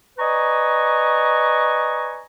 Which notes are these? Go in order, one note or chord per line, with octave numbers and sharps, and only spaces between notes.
B4 D5 D#5 G#5 A#5 C#6